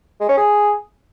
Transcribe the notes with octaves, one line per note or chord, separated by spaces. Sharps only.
G#3
C#4
G#4